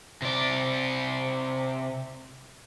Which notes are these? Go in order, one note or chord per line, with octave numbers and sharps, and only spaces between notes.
C3 D5